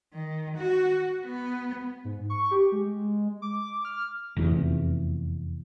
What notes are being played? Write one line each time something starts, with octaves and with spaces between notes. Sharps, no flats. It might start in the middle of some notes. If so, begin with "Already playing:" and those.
D#3
F#4
B3
G#2
C#6
G4
G#3
D6
F6
F1 E2